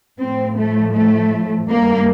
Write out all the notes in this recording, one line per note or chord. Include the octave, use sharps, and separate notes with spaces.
A2 F3 C4
A3
A3
G2 D#3 G3 A#3